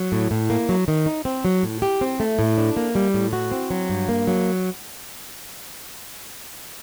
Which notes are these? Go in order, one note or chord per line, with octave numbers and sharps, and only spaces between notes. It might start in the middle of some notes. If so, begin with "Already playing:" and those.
Already playing: F#3
A2
A2
A#3
F#3
D#3
D#4
C4
F#3
A2
G4
C4
A3
A2
D4
A#3
G3
A2
F#4
C4
F#3
G2
A#3
F#3